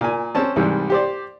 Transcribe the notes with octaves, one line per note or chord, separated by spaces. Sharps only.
A#2 G#5
C4 C#4 A5
C2 G#2 E3 G3
G4 C5 D5